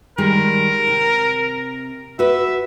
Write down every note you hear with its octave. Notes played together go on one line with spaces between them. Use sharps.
D#3 G3 G#3 A#4
C3
F#4 B4 E5